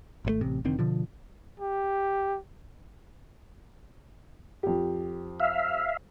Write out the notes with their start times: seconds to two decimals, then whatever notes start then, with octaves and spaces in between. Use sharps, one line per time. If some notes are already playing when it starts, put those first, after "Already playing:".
0.25 G#1 C3 A3
0.41 A1 C3
0.65 F1 D3 D#3 C4
0.79 B2 D3 F3
1.60 G4
4.63 F2 G4
5.40 E5 F5